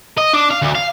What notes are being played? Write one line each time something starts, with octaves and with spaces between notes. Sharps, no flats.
D#5
D4
F5
D2
F5